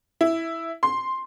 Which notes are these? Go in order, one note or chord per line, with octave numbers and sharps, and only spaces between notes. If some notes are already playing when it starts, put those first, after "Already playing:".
E4
C6